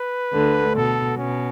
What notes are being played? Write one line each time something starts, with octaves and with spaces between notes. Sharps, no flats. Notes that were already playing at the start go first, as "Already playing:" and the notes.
Already playing: B4
D2 D3
B2 A4
B2 C#4